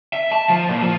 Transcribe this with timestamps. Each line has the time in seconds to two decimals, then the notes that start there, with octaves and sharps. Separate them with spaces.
0.13 E5
0.31 A5
0.50 F3
0.69 A#2
0.82 F3